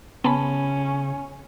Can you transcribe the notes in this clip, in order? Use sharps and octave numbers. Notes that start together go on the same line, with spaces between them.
C#3 B3 C#4 A5 B5